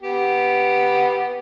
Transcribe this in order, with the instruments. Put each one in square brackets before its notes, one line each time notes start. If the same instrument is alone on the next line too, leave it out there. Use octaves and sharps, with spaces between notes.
[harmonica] B3 G4